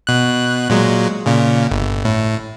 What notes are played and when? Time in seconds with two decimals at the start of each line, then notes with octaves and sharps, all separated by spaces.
0.07 B2 F#6
0.70 A#2 F#3 G#3
1.26 A#2 C#3
1.71 G1
2.05 A2